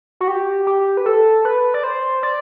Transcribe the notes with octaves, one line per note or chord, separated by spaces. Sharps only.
F#4
G4
G4
B4
A4
B4
D5
C5
D5